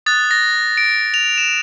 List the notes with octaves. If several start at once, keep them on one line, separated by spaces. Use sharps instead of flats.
D#6 F#6 A6
A#6
D7
F7
E7